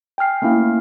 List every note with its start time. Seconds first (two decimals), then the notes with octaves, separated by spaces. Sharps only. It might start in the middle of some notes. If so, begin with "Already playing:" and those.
0.18 G5 G#5 F6 C7
0.42 A3 A#3 C#4 E4 F5